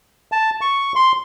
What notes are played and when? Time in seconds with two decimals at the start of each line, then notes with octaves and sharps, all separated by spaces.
0.32 A5
0.61 C#6
0.96 C6